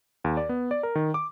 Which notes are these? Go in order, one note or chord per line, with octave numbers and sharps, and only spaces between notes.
D#2
D5
B3
D5
A#4
D#3
D6